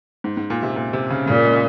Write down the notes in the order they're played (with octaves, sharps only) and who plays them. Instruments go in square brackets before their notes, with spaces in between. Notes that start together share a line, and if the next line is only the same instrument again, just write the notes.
[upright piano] G#2
G#2
A#2
C3
A#2
C3
C#3
[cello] A#2 [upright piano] C#3
[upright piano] G#3